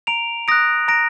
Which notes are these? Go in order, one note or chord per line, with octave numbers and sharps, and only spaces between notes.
A#5 D7 F7
D#6 F#6 A#6 D7
A#5 A#6 D7